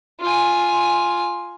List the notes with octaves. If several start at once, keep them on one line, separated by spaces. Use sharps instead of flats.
F4 G#5